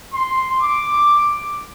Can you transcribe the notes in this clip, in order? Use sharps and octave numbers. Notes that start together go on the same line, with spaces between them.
C6
D6